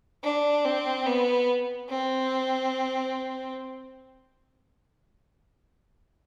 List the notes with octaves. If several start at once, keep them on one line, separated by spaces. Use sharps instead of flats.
D4
C4
B3
C4